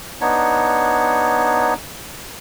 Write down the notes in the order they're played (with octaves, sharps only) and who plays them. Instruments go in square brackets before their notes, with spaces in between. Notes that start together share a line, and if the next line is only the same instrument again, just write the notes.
[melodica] B3 D4 D#4 C#5